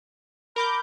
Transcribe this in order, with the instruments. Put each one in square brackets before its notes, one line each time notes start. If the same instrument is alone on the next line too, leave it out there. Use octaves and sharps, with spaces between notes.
[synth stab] A#4 D6 G6 [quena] B5